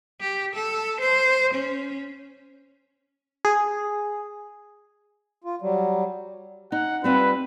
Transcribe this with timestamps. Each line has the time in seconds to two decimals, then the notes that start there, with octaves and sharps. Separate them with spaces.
0.21 G4
0.55 A4
1.00 C5
1.54 C#4
3.45 G#4
5.44 F4
5.61 F#3 G3
6.72 D#4 F#5
7.04 G3 C4 F4 B4